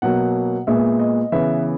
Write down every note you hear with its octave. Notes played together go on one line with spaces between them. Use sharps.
B2 F#3 A#3 F#5
A#2 G#3 B3 E5
D#5
C#3 E3 B3 E5